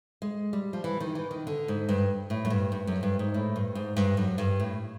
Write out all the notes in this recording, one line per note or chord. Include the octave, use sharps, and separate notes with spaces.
G#3
G3
F3
E3
D#3
E3
D#3
D3
G#2
G2
A2
F#2
G2
G2
F#2
G2
G#2
A2
G2
G#2
G2
F#2
G2
A2